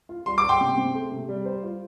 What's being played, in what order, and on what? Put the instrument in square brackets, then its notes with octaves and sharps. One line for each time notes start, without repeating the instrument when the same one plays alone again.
[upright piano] F4
[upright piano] G3 [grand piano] C6
[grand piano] D6
[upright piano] G2
[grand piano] G5 C6
[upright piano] C3
C4
A3
C3
G3
C5
F4